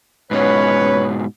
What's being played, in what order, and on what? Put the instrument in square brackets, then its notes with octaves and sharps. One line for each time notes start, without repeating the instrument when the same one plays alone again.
[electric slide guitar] G#2 B2 [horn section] C#4 B4 [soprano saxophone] C#5